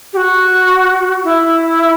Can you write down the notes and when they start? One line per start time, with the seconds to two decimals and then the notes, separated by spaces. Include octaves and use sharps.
0.13 G4
0.17 F#4
1.24 E4